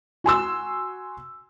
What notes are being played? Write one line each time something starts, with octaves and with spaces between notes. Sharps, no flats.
F#4 G#5 C6 E6